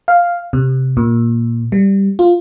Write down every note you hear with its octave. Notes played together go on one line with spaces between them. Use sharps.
F5
C3
A#2
G3
F4